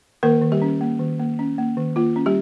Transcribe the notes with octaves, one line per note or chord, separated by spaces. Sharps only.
D#3 A#3 A#4
D#3
G3 G4
C#4
A#3
D#3
A#3
C#4
A#3
D#3
A#3 F4
C#4
G3 G4